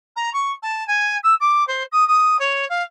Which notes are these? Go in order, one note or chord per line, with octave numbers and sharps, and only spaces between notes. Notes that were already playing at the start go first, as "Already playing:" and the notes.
A#5
C#6
A5
G#5
E6
D6
C5
D#6
D#6
C#5
F5